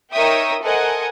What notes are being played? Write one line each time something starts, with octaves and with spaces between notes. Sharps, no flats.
D#4 A#4 C#5 E5 G5 D#6
A4 A#4 C5 D#5 F#5 G#5